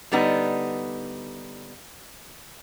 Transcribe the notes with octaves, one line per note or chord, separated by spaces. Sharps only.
D3 G3 B3 D#4